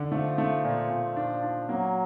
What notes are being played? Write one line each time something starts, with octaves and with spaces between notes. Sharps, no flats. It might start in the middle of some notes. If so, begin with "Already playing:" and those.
Already playing: D3
F3 A3
A3
A#2
A#2
D4
D4
F#3 A#3